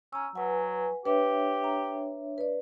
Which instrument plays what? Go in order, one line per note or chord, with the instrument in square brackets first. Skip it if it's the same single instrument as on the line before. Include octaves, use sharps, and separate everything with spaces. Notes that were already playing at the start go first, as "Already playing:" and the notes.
[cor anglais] C#4 [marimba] A#5 E6
[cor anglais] F#3 [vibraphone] B4 G#5 [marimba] F#5
[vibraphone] D4 C#5 E5 [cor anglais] G4 [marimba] B4
[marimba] A#5
B4 D5